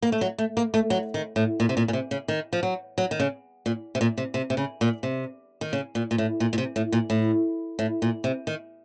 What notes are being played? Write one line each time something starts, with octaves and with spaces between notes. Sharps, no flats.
A#3
A3
F#3
A3
A#3
A3
F#3
D#3
A2
A#2
C3
A#2
A#2
C3
C#3
D#3
F3
F#3
F#3
D#3
C#3
A#2
C3
A#2
C3
C3
C3
C#3
A#2
C3
D#3
C#3
A#2
A#2
A2
A#2
A#2
C3
A2
A#2
A2
A2
A#2
C3
D#3